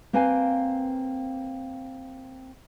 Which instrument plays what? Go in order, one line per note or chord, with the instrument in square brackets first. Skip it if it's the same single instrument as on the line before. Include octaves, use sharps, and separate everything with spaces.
[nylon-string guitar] A#3 C4 B4 F5 G5 G#5